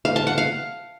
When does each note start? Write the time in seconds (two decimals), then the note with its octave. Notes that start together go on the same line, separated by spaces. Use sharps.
0.05 F5
0.16 A5
0.27 F#5
0.38 F5